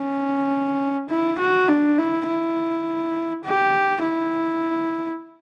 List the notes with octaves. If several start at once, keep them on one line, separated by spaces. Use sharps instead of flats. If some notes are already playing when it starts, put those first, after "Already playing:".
Already playing: C#4
E4
F#4
D4
E4
E4
G4
E4